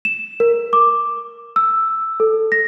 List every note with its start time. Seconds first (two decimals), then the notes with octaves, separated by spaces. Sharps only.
0.05 E7
0.40 A#4
0.73 D6
1.56 E6
2.20 A4
2.52 A#6